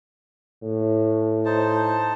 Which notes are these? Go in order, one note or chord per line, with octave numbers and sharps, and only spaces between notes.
A2
D#4 C5 A5